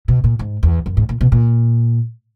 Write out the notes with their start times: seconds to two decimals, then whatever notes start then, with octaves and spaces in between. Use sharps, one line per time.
0.08 B2
0.24 A#2
0.39 G#2
0.63 E2
0.86 F#2
0.97 G#2
1.09 A#2
1.21 B2
1.32 A#2